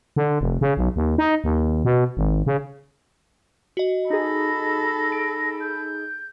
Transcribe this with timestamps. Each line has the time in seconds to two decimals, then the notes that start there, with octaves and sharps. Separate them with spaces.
0.16 D3
0.41 F1
0.61 C#3
0.77 B1
0.96 D#2
1.18 D#4
1.44 D#2
1.85 B2
2.17 G#1
2.46 C#3
3.77 F#4 D#5
4.10 D#4 G#4 A4 B5 A#6
5.12 D7
5.60 G6